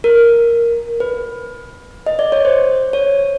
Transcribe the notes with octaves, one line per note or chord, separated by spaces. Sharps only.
A#4
B4
D#5
D5
C#5
C5
C#5